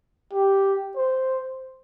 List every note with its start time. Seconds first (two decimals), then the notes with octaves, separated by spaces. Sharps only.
0.33 G4
0.96 C5